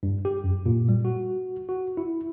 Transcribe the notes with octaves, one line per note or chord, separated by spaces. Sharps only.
G2
G4
F#2
A#2
G3
F#4
F#4
E4